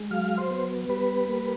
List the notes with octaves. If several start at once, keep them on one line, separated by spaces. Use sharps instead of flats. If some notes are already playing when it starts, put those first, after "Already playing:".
Already playing: G#3
F#3 F5
C5
B3
G3 B4
A#3